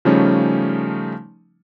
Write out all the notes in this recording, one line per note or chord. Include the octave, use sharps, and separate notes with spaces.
C#3 F3 G3 A3 C#4 D#4